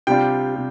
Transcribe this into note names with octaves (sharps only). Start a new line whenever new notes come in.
C3 G3 D4 F4 G5
C3